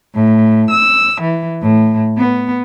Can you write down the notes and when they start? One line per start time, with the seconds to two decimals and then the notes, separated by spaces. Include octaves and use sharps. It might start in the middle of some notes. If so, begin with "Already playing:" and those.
0.15 A2
0.71 E6
1.20 E3
1.61 A2
2.17 B3